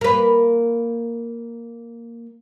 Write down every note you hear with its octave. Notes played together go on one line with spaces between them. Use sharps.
A#3 B4